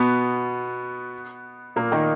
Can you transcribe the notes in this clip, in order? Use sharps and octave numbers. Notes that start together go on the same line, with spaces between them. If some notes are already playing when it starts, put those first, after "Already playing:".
Already playing: B2 B3
A#2 A#3
D#3 D#4